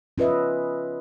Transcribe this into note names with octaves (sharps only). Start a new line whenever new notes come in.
C#4 F4 B4 D#5 E5